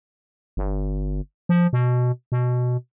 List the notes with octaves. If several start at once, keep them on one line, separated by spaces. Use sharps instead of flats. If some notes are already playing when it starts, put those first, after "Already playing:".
G1
F3
B2
B2